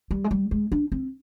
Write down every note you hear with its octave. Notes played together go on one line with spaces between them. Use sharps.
G3
G#3
G3
G#3
D4
C4